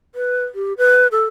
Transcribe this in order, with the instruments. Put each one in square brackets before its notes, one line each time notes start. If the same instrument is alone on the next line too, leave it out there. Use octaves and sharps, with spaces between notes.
[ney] B4
G4
B4
A4